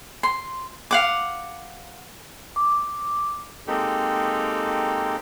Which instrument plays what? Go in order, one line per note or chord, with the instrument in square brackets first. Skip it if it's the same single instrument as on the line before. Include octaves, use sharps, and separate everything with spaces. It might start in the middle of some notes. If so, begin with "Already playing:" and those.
[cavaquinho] C6
F5 F#5 D6
[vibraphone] D6
[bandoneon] G#3 A#3 C4 D#4 G4 A4